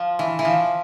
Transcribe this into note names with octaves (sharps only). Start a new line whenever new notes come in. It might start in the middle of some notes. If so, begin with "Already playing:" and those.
Already playing: F3
E3
E3
F3